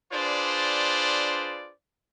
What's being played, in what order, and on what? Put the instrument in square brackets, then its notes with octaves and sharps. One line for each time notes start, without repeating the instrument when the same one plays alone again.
[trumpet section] D4 F4 G#4 B4 C5 D5